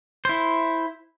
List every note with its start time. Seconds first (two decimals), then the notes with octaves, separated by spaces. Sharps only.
0.25 E4 C5